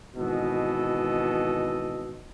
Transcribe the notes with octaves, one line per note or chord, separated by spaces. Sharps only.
G#1 B2 E3 A4 D#5